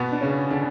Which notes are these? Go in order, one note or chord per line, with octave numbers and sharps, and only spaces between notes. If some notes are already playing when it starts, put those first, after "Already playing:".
Already playing: B2 B3
D4
C#3 C#4
D3 D4